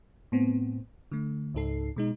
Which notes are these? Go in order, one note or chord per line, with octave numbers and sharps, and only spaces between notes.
A2 B3 C4
D3 A3
C#2 G#2 D#4 A4 C7
B2 G#3 D#4